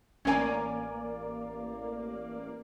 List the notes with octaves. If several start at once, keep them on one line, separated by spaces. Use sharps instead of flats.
A1 A#3 C#4 D5 G#5